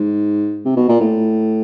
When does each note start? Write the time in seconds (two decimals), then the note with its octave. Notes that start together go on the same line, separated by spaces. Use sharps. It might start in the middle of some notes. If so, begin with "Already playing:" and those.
Already playing: G#2
0.65 C3
0.77 B2
0.89 A#2
1.01 A2